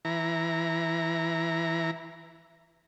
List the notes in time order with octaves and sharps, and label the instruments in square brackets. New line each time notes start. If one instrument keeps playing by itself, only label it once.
[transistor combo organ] E3 A#5